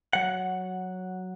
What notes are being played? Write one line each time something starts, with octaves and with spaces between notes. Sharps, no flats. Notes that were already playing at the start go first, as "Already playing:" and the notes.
F#3 F#5